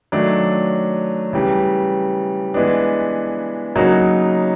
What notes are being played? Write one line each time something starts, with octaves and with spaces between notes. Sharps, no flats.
D#3 F#3 A3 D4
C#3 E3 G3
E3 G#3 B3 D4
C#3 F#3 A#3 D#4 F#4